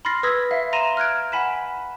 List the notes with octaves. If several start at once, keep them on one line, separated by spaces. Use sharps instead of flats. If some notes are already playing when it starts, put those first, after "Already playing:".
B5 C6 F6 A6 A#6 C7
B4 D#6 E6 G#6 A#6 B6
E5 F5
A#5 C6 A#6 D#7 E7
F6 F#6 G#6 D7
F#5 G#5 B5 B6 E7